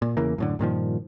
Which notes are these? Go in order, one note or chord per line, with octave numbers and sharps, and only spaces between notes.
A#2
E2 C#3 E3 A#3
F#2 A2 D3
G2 A#2 D#3 F3